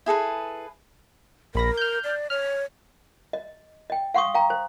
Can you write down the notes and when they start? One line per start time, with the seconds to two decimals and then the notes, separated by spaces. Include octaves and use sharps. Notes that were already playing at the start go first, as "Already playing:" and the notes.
0.06 E4 G#4 A4 B4
1.55 A#1 A#4 B5 A#6
1.77 F6 G6
2.04 D5
2.30 C#5 F6
3.33 D#5
3.90 D#5 G5
4.14 F5 F#5 C6 C#6 D#6
4.34 F5 G5 A#5
4.50 C5